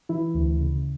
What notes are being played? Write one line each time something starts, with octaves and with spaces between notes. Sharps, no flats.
E3 E4
D2
C#3